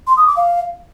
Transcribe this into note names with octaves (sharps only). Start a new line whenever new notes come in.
C6
D#6
D6
F5